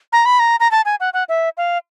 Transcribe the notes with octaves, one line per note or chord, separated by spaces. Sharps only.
A#5
B5
A#5
A#5
A5
G#5
F#5
F#5
E5
F5